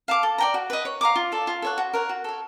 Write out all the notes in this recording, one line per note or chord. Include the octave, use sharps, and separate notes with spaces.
F5 A5 D6
A4
D5 G5 A#5
F#4
B4 D#5
C#5
F5 A#5 D6
F4
A4 D5
F4
A4 C#5 F#5
F#4
A#4 C#5 F#5
F#4
A4 C#5